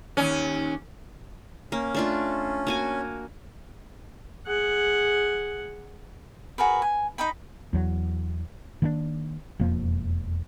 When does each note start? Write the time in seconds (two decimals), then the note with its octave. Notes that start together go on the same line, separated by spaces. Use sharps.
0.17 D#2 C#4
1.72 A#3 C#4
1.95 A3 D4 F4
2.67 A#3 F#4 G#5
4.47 G#4 F#5
6.58 F#4 G#4 A#4 B4
6.82 G#5
7.18 D#4 D#5 G5 B5
7.73 E2 F#3
8.82 D#3 A#3 B3 D4
9.59 E1 F2 F3 A#3